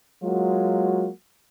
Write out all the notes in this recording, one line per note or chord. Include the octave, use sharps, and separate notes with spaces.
F#3 G#3 A#3 F4 F#4